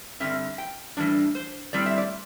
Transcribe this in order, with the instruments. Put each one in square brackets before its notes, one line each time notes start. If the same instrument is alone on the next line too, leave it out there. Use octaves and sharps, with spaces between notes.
[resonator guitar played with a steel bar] G2 D3 G3 C4 E5
G5
A2 E3 G3 D4 D5
C5
A2 G3 C4 D5
E5
D5